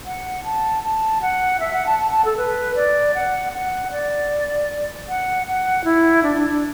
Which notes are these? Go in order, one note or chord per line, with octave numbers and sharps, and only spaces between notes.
F#5
A5
A5
F#5
E5
F#5
A5
A5
A5
A4
B4
D5
F#5
F#5
D5
F#5
F#5
E4
D4
D4
D4